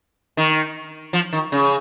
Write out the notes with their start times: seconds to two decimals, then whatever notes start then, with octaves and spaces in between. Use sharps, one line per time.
0.37 D#3
1.13 F3
1.33 D#3
1.52 C#3